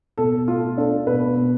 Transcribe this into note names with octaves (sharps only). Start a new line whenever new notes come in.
B2 A4
A3 F4
D4 A4
B2 B4
B2